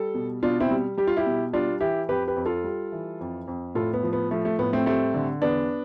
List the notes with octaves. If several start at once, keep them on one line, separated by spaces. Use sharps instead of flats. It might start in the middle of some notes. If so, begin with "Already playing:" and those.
Already playing: G3 A4
B2
B2 D4 F4
C4 E4
G3
G3 G4
F4
E4 G4
B2
G3 D4 F4
E3 E4 G4
F2 G4 B4
G4 B4
F2
F4 A4
G3
E3
F2
F2
A2 F4 A4
B3
F3
B3
F3 A3
A3
A2 B3
A3 C4
G3 A3 C4
D3
E2 B3 D4